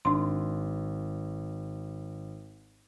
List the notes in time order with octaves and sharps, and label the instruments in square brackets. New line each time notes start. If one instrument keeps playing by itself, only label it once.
[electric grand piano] G#1 [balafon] D4 C6